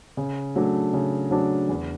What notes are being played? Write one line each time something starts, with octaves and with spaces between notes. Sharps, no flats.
C#3
F#3 A3 D4
C#3
F#3 A3 D4
E2